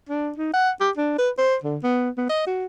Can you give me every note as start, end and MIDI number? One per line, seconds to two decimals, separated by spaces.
0.09 0.31 62
0.38 0.50 63
0.54 0.70 78
0.81 0.91 67
0.97 1.14 62
1.18 1.30 71
1.38 1.56 72
1.64 1.78 50
1.83 2.10 59
2.18 2.25 59
2.29 2.44 75
2.47 2.66 66